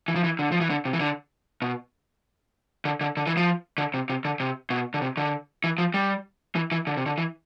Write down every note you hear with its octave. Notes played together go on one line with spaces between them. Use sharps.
E3
F3
E3
D3
F3
E3
D3
C3
E3
D3
B2
D3
D3
D3
E3
F3
D3
C3
C3
D3
C3
B2
D3
C3
D3
E3
F3
G3
E3
E3
D3
C3
D3
E3